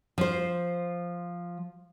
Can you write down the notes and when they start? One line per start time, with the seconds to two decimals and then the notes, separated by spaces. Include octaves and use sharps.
0.18 F3 C5